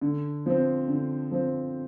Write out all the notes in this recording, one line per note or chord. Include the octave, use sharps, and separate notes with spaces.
D3
F3 C4
D3
F3 C4